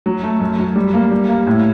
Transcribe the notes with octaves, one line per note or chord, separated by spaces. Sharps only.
F#3
A3
F#2
F#3
G3
A#3
G3
A#3
A2